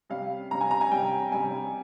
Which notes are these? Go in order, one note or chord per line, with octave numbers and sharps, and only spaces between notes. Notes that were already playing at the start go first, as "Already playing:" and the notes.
C3 G3 C#4 F5
C3 G3 C#4 A#5
G#5
A#5
G#5
C3 G3 C#4 G5
C3 G3 C#4 G#5